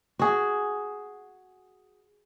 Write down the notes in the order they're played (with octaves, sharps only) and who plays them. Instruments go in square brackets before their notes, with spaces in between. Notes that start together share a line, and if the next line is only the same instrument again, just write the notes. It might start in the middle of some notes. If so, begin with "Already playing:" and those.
[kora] F#4 G#4